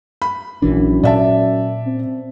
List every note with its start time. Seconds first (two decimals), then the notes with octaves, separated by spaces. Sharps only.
0.22 B5
0.62 A#1 F#2 E3 D4
1.03 A#2 D5 E5 A5
1.86 C4